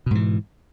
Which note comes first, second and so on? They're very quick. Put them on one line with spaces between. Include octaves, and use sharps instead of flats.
B2 G#2 E3